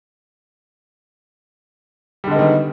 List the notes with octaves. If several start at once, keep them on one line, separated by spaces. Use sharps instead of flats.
D3 D#3 G3 G#3 B3